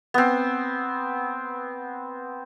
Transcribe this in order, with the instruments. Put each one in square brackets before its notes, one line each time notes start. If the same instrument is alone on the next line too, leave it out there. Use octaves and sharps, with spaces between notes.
[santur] B3 C4